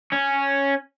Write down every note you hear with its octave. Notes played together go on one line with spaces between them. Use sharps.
C#4